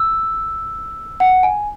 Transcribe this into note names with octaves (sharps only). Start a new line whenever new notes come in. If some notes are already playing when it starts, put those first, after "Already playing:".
Already playing: E6
F#5
G#5